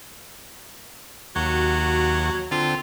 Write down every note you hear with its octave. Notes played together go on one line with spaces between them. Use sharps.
D#2 F#3 F#4
D3 C4 F4